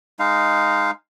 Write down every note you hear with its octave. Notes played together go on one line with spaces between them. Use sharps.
G#3 D#4 F5